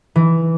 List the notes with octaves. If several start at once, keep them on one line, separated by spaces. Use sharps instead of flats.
E3